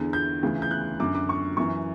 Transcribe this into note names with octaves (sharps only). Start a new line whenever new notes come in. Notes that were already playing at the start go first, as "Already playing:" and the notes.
Already playing: E2 D3
G6
D2 C#3 E3
G6
F#6
F#2 D3 D6
D6
C#6
F#2 E3 C#6